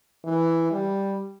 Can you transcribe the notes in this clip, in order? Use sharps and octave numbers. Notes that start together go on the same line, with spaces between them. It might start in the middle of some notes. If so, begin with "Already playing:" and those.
E3
G3